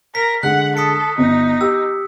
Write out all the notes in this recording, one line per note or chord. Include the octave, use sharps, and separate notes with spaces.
A#4 B6
D3 G#3 F#5 F#6
A4 D#6 B6 C#7
G1 D#4
G4 E6